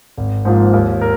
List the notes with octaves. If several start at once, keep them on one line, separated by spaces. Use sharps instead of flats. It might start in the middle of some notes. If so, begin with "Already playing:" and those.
G#1
G#2 F3 A#3 F4
D#2
A#4